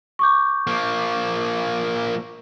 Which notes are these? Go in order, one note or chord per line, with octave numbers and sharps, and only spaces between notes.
C#6 D6 G6
F3 A#3